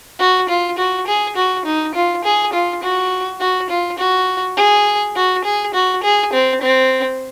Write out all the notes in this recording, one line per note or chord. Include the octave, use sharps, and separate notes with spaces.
F#4
F4
F#4
G#4
F#4
D#4
F4
G#4
F4
F#4
F#4
F4
F#4
G#4
F#4
G#4
F#4
G#4
C4
C4